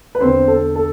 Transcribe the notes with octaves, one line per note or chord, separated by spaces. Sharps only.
B4
E2 D3 C4 C5
A4
A4